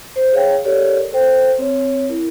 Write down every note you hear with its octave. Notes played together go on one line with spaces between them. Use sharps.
C5
G#4 C#5 F5 G5
G4 A4 A#4 C#5 D5
A4 C5 G5
C4 C#5
E4 A#4